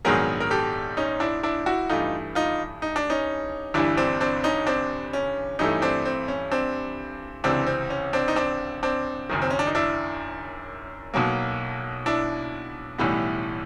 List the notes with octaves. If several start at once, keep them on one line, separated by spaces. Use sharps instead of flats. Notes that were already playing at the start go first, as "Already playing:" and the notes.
A#1 G#2 D#3 F#3 B3 G#4 A#4
A#4
G4 A4
C#4 D#4
D4 E4
D4 E4
E4 F#4
G2 E3 A3 D#4 F4
D#4 F4
D#4
D4
C#4 D#4
G1 G2 E3 D4 E4
C4 D4
C4 D4
C#4 D#4
C4 D4
C#4
G2 E3 A3 C#4 D#4
C4 D4
C4
C#4
C4 D4
C#2 C3 E3 C4 D4
C4
C#4
C4 D4
D#4
C4 D4
C4 D4
F#1 F#2 D#3
C4
C#4
D4
D#4
D4 E4
B1 B2 F#3 A#3
D4 E4
B1 A2 E3 G3 B3